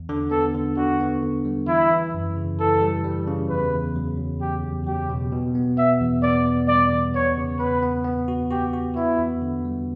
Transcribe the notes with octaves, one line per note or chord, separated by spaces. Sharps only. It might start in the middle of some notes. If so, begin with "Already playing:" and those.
Already playing: E2
D3
B3 A4
D3
D3 F#4
B3
D3
G3
E3 E4
E3
F#2
C#3
E3 A4
G3
G3
C#3
E2 B4
E2
F#3
F#3
E2 G4
E2
F#3 G4
B2
B2
B3
B3 E5
E2
B3 D5
B3
G3 D5
E2
B3 C#5
C#3
B3 B4
B3
B3
F#4
F#4 G4
F#4
B3 E4
E2
D3
G3